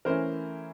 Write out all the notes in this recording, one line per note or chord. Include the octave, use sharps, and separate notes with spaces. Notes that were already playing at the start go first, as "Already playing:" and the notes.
E3 A3 C#4 E4 A#4 C5